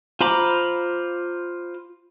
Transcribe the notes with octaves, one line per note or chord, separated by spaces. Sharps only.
F4 C5 A#5 B5 D6